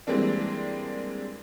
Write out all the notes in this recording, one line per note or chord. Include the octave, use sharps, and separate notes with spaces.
E3 G3 G#3 A#3 C4 D4